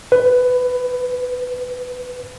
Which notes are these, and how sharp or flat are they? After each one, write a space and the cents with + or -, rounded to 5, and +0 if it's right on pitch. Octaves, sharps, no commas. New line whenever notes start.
B4 +15